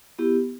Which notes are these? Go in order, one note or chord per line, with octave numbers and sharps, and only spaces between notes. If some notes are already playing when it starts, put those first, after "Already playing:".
B3 E4 G4